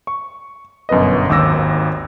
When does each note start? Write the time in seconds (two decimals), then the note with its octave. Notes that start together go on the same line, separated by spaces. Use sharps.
0.07 C#6
0.89 G1 F#2 B2 B4 D#5
1.29 G#1 D#2 D6 E6 A#6